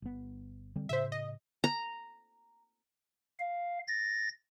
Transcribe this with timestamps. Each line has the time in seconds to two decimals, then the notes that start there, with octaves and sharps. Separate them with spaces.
0.02 G1 B3
0.76 D3 G3 C4
0.89 A2 C#3 C5 E5
1.12 D#5
1.64 A#5
3.39 F5
3.88 A6 A#6